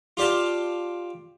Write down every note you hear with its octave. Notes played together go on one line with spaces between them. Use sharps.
F4 G4 D5 F5 A5